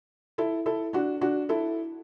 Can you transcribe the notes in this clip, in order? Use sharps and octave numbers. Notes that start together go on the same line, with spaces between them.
E4 A4
E4 A4
D4 F#4
D4 F#4
E4 A4